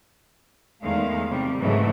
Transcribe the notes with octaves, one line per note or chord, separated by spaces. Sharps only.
E2 D#3 G#3 A3 F5
C3 G3
G#2 C#3 E3 F#3 G#3 A3